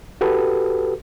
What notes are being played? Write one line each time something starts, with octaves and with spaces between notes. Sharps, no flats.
F#4 G4 A4 B4